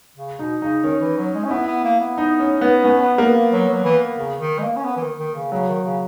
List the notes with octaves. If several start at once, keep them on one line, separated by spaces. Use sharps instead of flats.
C#3
B2 D#4
C#3 D#4
D#3 C#4
E3
F#3
G#3
C#4
B3 E4
B3
A#3
B3
D#4
C#4
B3
B3 C#4
B3
A#3 B3
A#3
F#3
F#3
E3
C#3
D#3
G#3
A#3
C#4
B3
E3
D#3
D#3
C#3
C#3 F#3
D#3
C#3